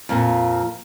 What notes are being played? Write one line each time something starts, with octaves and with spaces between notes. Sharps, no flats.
F2 A#2